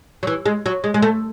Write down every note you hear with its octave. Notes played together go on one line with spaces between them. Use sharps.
F#3
E3
G#3
F#3
G#3
G#3
A3